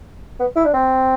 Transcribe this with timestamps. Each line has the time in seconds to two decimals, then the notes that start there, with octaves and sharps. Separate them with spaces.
0.40 B3
0.56 E4
0.65 D4
0.73 C4